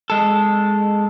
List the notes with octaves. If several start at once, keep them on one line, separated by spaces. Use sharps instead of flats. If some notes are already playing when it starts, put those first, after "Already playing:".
G#3 A4